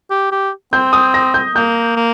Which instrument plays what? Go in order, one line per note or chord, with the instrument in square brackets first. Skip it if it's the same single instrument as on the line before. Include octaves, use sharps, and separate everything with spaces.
[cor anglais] G4
G4
[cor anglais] C4 [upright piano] G6
[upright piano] D#6
A#6
G6
[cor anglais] A#3 [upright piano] G6
[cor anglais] A#3